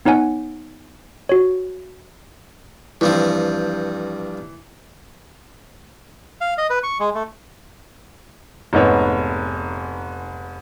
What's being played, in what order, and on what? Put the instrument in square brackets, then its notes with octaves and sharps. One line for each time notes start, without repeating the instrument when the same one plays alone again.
[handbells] B3 D#4 C#5 F#5 G#5
F#4 C#5
[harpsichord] G2 F3 C4 [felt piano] E3
[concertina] F5
D#5
B4
C#6
G#3
A3
[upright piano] F1 G#2 B3 C#5